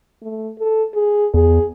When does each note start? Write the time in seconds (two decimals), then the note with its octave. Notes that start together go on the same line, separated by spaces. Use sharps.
0.22 A3
0.59 A4
0.95 G#4
1.34 E2 G#4